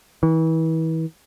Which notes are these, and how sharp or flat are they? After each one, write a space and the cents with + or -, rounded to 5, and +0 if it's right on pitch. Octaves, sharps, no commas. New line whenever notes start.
E3 -35